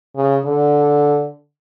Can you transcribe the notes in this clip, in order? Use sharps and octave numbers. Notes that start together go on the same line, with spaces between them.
C#3
D3